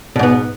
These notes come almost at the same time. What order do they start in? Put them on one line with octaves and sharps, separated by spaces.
B2 G#2 B3